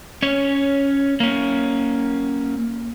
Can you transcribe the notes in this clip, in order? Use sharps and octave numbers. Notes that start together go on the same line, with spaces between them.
C#4 C#5
A#3 C#4